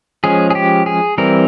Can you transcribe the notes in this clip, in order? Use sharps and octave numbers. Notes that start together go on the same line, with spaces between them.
F3 G#3 C#4 G#4
G#4
G4
G#4
E3 G3 C4 A#4